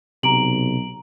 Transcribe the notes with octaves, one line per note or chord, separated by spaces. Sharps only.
B1 C3 A#5 D7 F#7